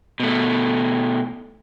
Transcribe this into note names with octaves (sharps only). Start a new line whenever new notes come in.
B2 A3